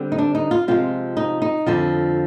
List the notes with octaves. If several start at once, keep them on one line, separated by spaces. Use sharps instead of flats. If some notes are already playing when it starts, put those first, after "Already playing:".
Already playing: D3 G3 C4
D#4
D4
D#4
F4
C3 F3 G#3 F4
D#4
D#4
F2 D3 F3 F4